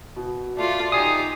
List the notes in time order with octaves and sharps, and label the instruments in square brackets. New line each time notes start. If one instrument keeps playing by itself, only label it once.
[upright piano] B2
[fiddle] A3 F4 [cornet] D5
[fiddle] D#4 G4 [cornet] G#5 [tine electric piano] D#6 C7